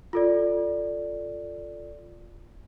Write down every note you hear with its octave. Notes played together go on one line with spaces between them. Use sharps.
F4 A4 D5